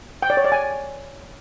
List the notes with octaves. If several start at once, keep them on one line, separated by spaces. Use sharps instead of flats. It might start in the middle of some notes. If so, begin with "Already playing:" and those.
G5
D5
C#5
D5
G#5